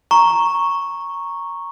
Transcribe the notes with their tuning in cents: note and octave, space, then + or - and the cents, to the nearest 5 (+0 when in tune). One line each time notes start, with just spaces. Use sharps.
A#5 -5 C#6 -5